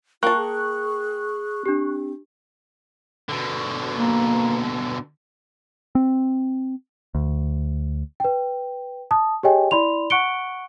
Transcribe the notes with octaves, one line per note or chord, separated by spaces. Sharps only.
A#3 F4 G5 A5 C#6 F#6
G#4
C4 D4 G4
B2 D3
A#3
C4
D2
B4 G5
A5 D#6
G4 G#4 C#5 D#5 G5 G#5
E4 D5 B5 C6 F7
F#5 C#6 F#6 C#7 D7 G7